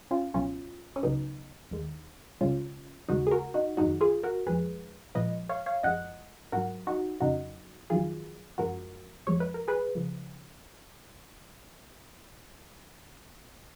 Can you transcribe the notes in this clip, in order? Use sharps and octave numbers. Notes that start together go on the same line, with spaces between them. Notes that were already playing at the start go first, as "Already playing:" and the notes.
C#4 F4
C#2 B2 F#3 C#4 F4
C#4
C#2 C#3 F#3 B3 D#4
D#2 D#3 G#3
C#2 C#3 G#3 C#4 F4
D#2 C#3 G#3 D#4 F#4
G#4
F#4 A#4
D#4 F#4
F#2 D#3 G#3 D#4 F#4
F4 G#4
F#4 A#4
F2 F3 G#3 G#4 B4
A#2 F3 G#3 B4 D#5
C#5 F5
C#5 F5
F#2 F3 G#3 D#5 F#5
G#2 F#3 F#4 A#4
D#4 F#4
F2 C#3 F#3 D#4 F#4
F2 D#3 F#3 F4 G#4
F#2 F3 G#3 F#4 A#4
F2 F3 G#3 C#5
B4
A#4
G#4 B4
C#3 F3